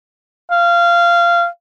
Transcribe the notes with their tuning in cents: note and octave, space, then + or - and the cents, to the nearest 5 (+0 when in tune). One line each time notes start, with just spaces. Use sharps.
F5 -20